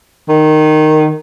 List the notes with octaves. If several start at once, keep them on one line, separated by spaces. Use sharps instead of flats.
D#3